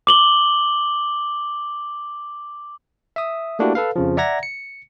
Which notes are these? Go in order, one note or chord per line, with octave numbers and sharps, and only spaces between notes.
D6 F#7 G7
E5 D#6
A3 A#3 D4 E4 F#4 G4
A4 B4 F5
F2 C#3 F3
D5 E5 F#5 A#5 G#6 A#6
C#7